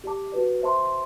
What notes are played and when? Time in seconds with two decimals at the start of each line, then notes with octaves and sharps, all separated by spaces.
0.04 G4 D5 A5 D6
0.32 F#4 B4 D5
0.62 C5 E5 A5 C6